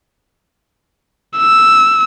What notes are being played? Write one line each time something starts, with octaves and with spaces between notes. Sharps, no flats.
E6